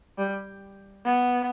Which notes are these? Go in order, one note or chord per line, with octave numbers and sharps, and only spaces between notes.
G3
B3